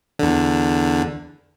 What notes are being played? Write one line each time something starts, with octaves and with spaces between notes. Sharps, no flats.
E2 D3